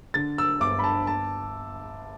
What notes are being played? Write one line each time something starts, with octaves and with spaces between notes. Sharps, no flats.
D3 A6
E6
G1 D6
B5
A5
A5